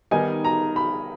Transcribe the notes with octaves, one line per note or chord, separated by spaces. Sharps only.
D#3 G3 B3 D#4 G#5
A#5
B5